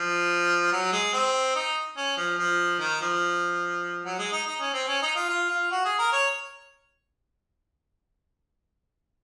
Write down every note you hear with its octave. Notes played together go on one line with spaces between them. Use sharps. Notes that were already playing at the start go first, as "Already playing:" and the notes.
Already playing: F3
F#3
G#3
C4
D#4
C#4
F3
F3
D#3
F3
F#3
G#3
D#4
D#4
C#4
C4
C#4
D#4
F4
F4
F4
F#4
G#4
A#4
C#5